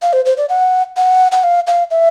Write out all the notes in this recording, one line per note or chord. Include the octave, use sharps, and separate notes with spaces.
F5
C5
C5
D5
F#5
F#5
F#5
F5
F5
E5